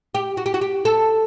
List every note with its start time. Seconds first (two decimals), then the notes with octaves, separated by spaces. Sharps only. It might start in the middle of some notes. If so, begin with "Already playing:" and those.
0.15 G4
0.37 F#4
0.46 G4
0.54 F#4
0.61 G4
0.85 A4